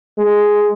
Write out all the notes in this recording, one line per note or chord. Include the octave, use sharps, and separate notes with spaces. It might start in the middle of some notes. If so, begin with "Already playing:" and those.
G#3